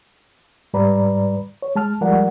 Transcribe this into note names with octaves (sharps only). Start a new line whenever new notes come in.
G#2 G3 B4 D5 A#5 B5
C#5
G#3 A5 F6
F3 G3 G#3 A#4 D5 F#5